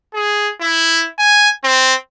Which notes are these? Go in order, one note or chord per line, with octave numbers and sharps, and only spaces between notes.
G#4
E4
G#5
C4